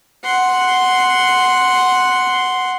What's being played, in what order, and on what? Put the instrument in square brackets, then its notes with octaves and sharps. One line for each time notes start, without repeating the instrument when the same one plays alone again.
[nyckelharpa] F#5 C6